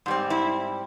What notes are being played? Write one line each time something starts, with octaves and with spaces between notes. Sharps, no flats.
G#2 G3 C4
E4